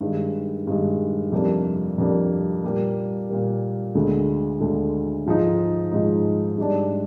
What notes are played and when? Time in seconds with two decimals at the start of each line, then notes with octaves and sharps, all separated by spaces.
0.01 G2 D#3 G#3
0.67 G2 D#3 G#3
1.32 F2 C3 G3 A#3 D4
1.98 F2 C3 G3 A#3 D4
2.64 A#2 G3 A#3
3.30 A#2 G3 A#3
3.95 D2 D3 G#3
4.60 D2 D3 G#3
5.26 G#2 F3 G#3 D#4
5.91 G#2 F3 G#3 D#4
6.58 G#2 G3 D4